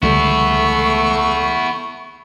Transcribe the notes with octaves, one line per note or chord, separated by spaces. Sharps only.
C#2 D3 G3 A3 B3 E4 C#6